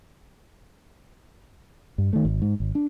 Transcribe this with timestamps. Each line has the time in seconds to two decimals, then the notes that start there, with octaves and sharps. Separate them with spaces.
1.98 G2
2.13 D#3 A3
2.25 G#1
2.42 G#2
2.60 G#1
2.75 D4